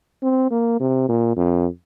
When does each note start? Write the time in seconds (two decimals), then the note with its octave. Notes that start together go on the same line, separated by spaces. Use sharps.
0.23 C4
0.51 A#3
0.80 C3
1.09 A#2
1.37 F2